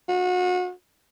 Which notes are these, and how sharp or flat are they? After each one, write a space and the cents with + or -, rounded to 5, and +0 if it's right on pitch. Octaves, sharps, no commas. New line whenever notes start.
F#4 -35